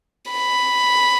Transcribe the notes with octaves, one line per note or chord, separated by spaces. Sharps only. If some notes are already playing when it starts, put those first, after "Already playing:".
B5